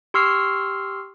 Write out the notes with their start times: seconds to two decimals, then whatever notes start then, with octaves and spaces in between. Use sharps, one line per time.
0.14 G4 C6 C#6 E6 F6 C7